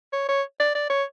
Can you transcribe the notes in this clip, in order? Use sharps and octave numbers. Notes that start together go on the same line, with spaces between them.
C#5
C#5
D5
D5
C#5